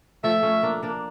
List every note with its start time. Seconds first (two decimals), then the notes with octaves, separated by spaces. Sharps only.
0.24 F3 A3 E5
0.43 A3 C#4
0.63 A#3 D4
0.83 A#3 D4